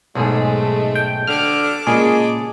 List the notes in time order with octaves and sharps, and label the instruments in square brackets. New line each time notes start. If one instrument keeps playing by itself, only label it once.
[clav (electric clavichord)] B1 G#2 G#4 [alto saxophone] G#3 [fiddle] A3
[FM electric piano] G5
[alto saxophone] D3 [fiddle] A5 D6 [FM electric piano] F6
[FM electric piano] A#2 G#4 [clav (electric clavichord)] C#3 [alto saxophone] G#3